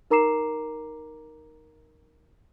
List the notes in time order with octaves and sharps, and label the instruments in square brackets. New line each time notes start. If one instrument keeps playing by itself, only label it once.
[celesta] D#4 A#4 A#5 D6 C7 E7